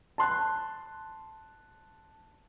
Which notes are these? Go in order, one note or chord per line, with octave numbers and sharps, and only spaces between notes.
A5 C6 F#6